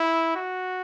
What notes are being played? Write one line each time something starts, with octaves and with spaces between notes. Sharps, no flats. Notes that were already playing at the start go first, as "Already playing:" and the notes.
Already playing: E4
F#4